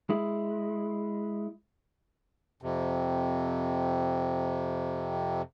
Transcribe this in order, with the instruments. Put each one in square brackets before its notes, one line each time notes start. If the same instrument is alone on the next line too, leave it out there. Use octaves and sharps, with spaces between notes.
[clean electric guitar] G#3 E4
[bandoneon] F2 C3